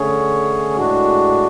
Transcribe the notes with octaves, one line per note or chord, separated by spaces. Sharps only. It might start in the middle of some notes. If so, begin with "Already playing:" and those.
Already playing: D3 A3 C#4 G#4 C#5
A2 G#3 D4 F#4